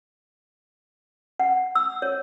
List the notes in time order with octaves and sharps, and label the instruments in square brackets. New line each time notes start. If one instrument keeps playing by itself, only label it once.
[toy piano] F#5
E6
C#5